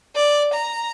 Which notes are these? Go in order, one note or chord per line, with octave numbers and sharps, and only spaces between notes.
D5
A#5